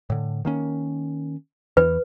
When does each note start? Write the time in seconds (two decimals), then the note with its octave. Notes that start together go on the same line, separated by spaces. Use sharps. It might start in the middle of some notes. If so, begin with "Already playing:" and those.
0.10 A2 D3
0.45 D#3 A#3 C#4
1.77 E2 E3 B4